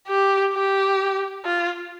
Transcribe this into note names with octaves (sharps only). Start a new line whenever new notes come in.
G4
G4
F4